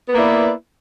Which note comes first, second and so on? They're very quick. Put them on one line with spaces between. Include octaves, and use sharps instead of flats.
B3 B4 A#3 E4 D5